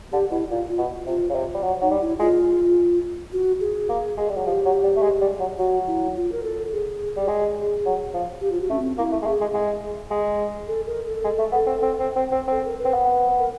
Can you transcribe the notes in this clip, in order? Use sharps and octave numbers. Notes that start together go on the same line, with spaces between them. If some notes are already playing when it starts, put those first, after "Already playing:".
D3 G4
B2 E4
A#2 F4
F4
B2
C3 F4
C#3
C3
G3
F#3
F#3 D#4
G3
E4
G#3 F4
F#4
G#4
A#3
G#3
G3
F#3
F3 G4
F#3
G3
A3
G#3
G3
F#3
F#3 F#4
E4
F4
A#4
A4
G#4
G3
G#3
F#3
F3
G4
F4
F#4
A3 C#4
C4
A#3 E4
A3
G#3
A3 G#4
G#3
G#3
G#3
A4
A#4
A4
G#3
A3
B3
C4
C4
C4
C4
C4
C4 A4
A#4
B4
C4
B3
A#4